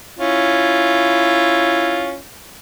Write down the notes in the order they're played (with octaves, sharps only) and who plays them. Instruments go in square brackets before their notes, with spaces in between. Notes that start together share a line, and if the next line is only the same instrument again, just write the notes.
[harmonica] C#4 E4 F4